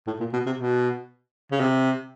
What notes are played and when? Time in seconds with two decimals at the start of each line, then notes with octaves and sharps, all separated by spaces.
0.07 A2
0.20 A#2
0.33 B2
0.46 C3
0.58 B2
1.52 C#3
1.60 C3